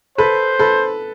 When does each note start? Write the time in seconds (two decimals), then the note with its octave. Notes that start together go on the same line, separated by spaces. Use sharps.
0.18 A4 B4 C5
0.59 A4 B4